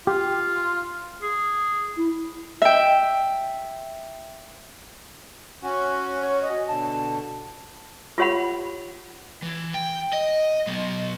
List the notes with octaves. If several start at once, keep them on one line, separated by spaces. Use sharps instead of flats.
F4 G4
G#4
E4
E5 G5
C#4 F#4
C#5
D#5
B2 D3 A5
F4 G4 C#5 F#5 B5
E3
G5
D#5
F#3 B3